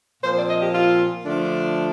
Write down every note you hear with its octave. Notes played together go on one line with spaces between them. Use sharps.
A#2 F3 C4 C5
D5
D#5
G4
F4
D3 F3 A3 D4